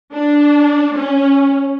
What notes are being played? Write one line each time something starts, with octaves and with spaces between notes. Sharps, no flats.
D4
C#4